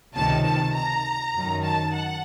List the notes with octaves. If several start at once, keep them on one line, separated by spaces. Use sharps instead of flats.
C#2 C3 D#3 A5
A5
A#5
F#2 D#3
A5
F#5